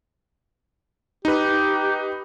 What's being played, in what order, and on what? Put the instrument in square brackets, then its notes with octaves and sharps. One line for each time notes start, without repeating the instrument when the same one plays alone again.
[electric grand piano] D#4 B4 [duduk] G4